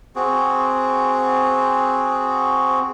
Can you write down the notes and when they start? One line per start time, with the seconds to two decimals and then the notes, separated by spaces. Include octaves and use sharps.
0.16 C4 F#4 G#4